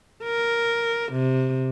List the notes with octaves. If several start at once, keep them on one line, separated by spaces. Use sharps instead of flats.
A#4
C3